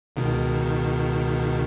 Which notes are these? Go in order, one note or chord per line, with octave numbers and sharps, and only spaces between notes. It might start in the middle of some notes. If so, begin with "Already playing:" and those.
C#2 B2 D#3